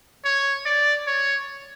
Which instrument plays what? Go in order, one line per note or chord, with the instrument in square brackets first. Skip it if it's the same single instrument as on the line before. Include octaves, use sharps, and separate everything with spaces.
[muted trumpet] C#5
D5
C#5